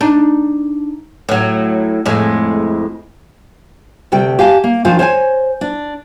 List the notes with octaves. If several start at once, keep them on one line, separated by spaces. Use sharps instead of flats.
D4 D#4
A2 F#3
F2 A2 G#3
D2 C3 G3 G5
G4 F5 G#5 A5
A#3
D#3 F3 D4 F4 C5 G#5
C5 C#5 F5 G#5
D4